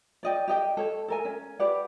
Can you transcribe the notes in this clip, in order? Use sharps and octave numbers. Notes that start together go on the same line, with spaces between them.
D5 D#5 G5
G4 D#5 G5
A4 C#5
A4 A#4 G#5
C#4
G4 B4 D5 F#5